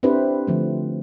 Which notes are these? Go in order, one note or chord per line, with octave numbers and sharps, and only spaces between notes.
C4 D4 E4 G4 B4 C5
D3 F3 A3